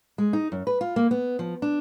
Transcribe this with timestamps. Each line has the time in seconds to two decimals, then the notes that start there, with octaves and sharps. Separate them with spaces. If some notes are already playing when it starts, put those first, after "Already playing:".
0.18 G#3
0.33 D#4
0.52 F#2
0.67 B4
0.81 F4
0.96 A#3
1.11 B3
1.39 F3
1.62 D4